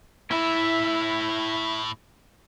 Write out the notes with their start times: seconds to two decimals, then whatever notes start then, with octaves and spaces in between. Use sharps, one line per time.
0.31 A2 E4 E5